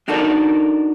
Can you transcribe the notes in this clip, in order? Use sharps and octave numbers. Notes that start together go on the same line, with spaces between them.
D4 D#4 F#4 A4 A#4 D5